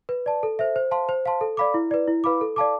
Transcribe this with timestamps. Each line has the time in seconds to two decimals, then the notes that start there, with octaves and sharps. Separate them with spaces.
0.09 B4
0.26 D5 A5
0.43 A4
0.59 C5 E5
0.76 C5
0.91 F5 A5 C6
1.09 C5
1.26 F5 A5 C6
1.41 A4
1.57 D5 F5 B5 D6
1.74 E4
1.91 B4 D5
2.07 E4
2.24 B4 F5 B5 D6
2.41 A4
2.56 D5 F5 A5 D6